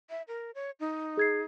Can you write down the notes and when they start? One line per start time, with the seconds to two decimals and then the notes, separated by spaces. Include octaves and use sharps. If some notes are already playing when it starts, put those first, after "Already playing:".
0.10 E5
0.28 A#4
0.55 C#5
0.80 D#4
1.17 G#4 G#6 C7